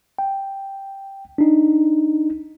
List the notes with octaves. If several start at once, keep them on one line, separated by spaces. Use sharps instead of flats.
G5
D4 D#4